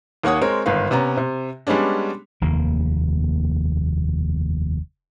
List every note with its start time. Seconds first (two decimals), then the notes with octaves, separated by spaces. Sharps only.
0.23 D#2 A#3 C#5 F#5 D#6
0.41 G#3 C4 A#4 C#5
0.66 G1 G#2 D#3 B4 F5
0.91 C3 B3 C#4 A#5
1.17 C3
1.67 G3 G#3 B3 C#4 D4
2.41 F1 D#2 A#3